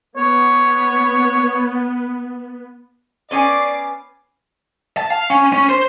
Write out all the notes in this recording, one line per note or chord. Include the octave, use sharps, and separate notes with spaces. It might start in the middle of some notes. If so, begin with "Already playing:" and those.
B3 C#5
B3 C#4 D5 G#5 D6 C7
A5
F5
C#4
C#4
C5